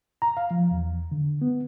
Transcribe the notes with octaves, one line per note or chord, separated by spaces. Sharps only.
A#5
F5
F3
E2
D3
B3